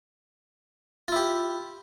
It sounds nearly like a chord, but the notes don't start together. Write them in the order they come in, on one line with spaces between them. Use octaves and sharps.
F4 E4 G4